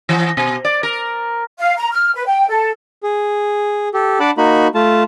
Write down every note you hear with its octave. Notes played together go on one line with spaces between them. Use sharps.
E3
B2
D5
A#4
F5
A#5
F6
B4
G5
A4
G#4
G4 A4
D4 D5 F#5 A5 B5
A#3 D#4 F#4 B5
A3 F4 A5